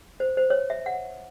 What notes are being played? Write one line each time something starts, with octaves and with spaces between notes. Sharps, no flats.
C5
C5
C#5
E5
F#5